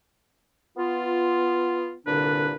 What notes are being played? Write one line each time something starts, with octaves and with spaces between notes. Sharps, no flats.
B3 F4
C2 A#2 D3 D4 B4